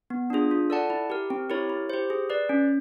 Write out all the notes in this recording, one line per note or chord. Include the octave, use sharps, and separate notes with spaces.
B3
D4 F4 G#4
F4
A4 D5 F#5 A5
E4
G4 A#4
C4
E4 G4 A#4 C#5
E4
G4 C5
G#4
B4 D5
C#4